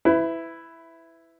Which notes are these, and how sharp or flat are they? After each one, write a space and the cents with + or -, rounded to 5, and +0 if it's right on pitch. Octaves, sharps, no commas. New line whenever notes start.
E4 +0 B4 +30